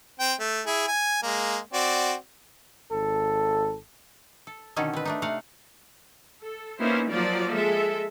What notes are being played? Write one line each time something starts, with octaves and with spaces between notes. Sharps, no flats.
C4 G5
A3
E4 G#4
G#5
G#3 A#3
C4 F#4 D5
G#1 A4
A4
B2 D3 D#3 C#4 D#4 A4
C4 B4
A3 D4 D#4
C3 A3 F5 F#5 A#5
A4
A#3 B3 C#4 D#4 E4 C5
F3 F#3 A#3 F4 D5
G#3 A4 E5